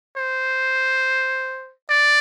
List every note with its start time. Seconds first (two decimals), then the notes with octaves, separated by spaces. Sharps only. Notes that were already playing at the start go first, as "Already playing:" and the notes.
0.17 C5
1.90 D5